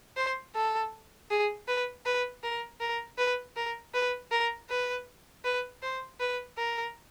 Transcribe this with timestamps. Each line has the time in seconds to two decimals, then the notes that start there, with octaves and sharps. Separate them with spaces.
0.17 C5
0.55 A4
1.30 G#4
1.68 B4
2.06 B4
2.43 A#4
2.81 A#4
3.18 B4
3.56 A#4
3.94 B4
4.31 A#4
4.70 B4
5.44 B4
5.82 C5
6.20 B4
6.58 A#4